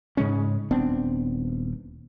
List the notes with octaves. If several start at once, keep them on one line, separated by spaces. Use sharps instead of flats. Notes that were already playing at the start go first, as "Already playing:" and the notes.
G#2 C#3 G#3 C#4
D#1 B3 C4 D4